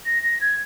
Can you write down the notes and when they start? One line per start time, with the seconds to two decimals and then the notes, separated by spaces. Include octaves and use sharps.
0.05 A#6
0.23 A#6
0.41 G#6